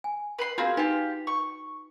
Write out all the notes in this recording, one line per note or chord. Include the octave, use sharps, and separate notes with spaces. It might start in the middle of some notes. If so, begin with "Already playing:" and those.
G#5
B4 B5 C6
A#3 C4 F4 F#4 G#4 F5
D#4 F4 G4 B4 G#5
C#6